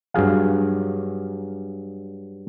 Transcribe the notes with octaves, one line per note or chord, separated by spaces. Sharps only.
G2 F#3 G#4 F5